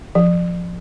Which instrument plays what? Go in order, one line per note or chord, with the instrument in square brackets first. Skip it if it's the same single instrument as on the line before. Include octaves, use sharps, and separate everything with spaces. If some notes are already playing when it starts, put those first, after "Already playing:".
[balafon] F3